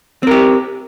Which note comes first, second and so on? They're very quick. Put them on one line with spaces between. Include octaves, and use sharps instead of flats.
C4 A#4 G4